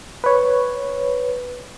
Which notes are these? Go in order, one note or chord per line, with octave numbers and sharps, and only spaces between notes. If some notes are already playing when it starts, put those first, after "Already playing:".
B4 C#5